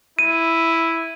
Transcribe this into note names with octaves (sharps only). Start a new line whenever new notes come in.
E4 D#7